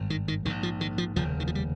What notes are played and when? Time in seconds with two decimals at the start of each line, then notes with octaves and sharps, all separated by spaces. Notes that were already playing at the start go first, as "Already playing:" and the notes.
Already playing: G#1 G2
0.10 D#3
0.28 D#3
0.45 A#1 G#2 D#3
0.63 F3
0.81 D#3
0.98 F3
1.16 F1 D#2 C#3 F3
1.40 D#3
1.47 F3
1.55 G3